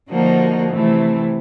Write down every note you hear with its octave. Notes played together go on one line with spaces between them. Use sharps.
D3 F3 A#3 D#4 F#4
C3 E3 A3